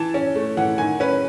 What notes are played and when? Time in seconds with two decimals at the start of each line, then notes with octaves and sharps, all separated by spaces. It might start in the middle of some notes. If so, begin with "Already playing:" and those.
Already playing: E3 A5
0.14 C#4
0.36 A3
0.57 E3 F#5
0.78 D#3 G#5
1.00 C#4 B4